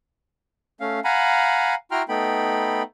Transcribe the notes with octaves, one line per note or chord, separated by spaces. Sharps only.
A3 C#4 F5
F5 F#5 G#5 A#5 B5
E4 F#4 G5 A#5 C6 F6
A3 B3 D#4 G5 B5